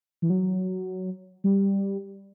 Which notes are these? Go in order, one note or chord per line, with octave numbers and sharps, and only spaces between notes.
E3
F#3
G3